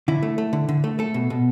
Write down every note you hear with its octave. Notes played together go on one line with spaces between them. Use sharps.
D3 E4
A3
A3
D3
D3
A3
A3 A4
B2
B2